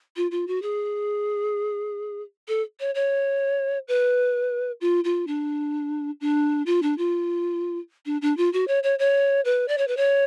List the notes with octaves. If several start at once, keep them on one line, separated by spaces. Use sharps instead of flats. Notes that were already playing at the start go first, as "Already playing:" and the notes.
F4
F4
F#4
G#4
A4
C#5
C#5
B4
F4
F4
D4
D4
F4
D4
F4
D4
D4
F4
F#4
C#5
C#5
C#5
B4
D5
C#5
B4
C#5